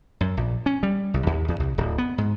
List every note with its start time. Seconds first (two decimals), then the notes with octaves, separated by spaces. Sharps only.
0.21 F#2
0.37 A#1
0.66 C#4
0.83 G3
1.14 C2
1.27 D#2
1.48 E2
1.60 C2
1.78 D1
1.98 B3
2.18 G#2